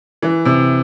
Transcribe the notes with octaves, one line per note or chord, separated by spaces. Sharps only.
E3
C3